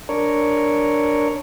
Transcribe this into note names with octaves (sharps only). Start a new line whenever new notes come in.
D4 A#4 C#5